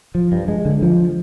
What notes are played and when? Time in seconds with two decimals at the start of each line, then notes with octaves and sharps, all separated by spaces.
0.15 F3
0.32 G2
0.48 G#3
0.65 D3
0.82 F3